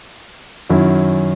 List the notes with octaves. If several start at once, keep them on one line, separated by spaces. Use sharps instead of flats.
F#2 D#3 F#3 C#4 E4